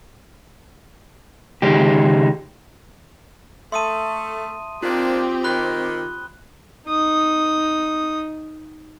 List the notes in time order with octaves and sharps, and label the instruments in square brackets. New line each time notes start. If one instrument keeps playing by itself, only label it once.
[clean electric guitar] C#2 D#3 G#3 G4
[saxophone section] A3 [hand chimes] E5 A5 [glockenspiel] C6 D#6 D#7
[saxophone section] D#3 A#3 D4 [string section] C4 G4 [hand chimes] F4
[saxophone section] D#3 [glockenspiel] B5 F#6 G7
[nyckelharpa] D#4 D#6